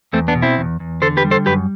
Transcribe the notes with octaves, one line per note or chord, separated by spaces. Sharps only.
E2 A3 C4
B3 D4
B2
C4 E4
E2
E2
D3 A4 C5
G4 B4
G3
A4 C5
F#2 G4 B4